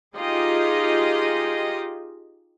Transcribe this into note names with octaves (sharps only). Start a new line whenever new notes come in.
D#4 F4 G4 G#4 D#5